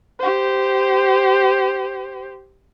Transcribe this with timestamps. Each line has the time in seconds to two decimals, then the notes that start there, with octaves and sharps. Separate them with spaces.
0.20 G4 C5